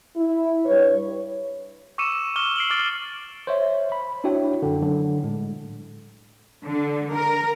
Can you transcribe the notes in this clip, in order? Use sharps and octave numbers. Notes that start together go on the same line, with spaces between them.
E4
G2 B4 C#5
C#6 D6 E6 C#7 D#7 E7
E7
C#6 D6 F6 G7
C7 D7 F#7 G7
D6 F6 A6 D7 G7
C5 C#5 E5
B5
D4 E4 F#4 C#5 G5
F#2 D3
D3 F#3
A2 G#3
D3
A#4